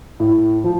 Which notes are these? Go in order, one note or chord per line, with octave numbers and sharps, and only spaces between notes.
A2
F3